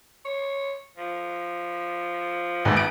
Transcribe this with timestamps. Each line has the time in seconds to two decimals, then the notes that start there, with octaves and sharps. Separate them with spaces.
0.25 C#5
0.97 F3
2.65 A1 D#2 G#2 B3
2.77 B3 D7